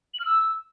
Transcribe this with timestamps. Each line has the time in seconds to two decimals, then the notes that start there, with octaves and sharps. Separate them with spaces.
0.14 F#7
0.19 F6
0.25 E6